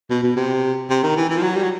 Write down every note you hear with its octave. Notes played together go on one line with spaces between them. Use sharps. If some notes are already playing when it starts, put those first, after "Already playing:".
B2
B2
C3
C3
D#3
E3
E3
F3
F#3
G3
F#3